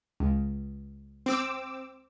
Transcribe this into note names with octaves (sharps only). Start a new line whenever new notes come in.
C#2
C4 D6 E6